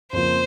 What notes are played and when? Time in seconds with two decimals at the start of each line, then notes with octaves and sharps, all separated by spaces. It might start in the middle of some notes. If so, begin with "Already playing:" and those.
0.13 F2 C#3 F3 A#3 C5